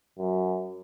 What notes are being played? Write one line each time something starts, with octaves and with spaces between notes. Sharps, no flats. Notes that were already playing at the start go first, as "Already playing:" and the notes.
F#2